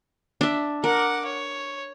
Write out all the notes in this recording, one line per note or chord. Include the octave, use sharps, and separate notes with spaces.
D4 E5
A#4 F#5 D6
C#5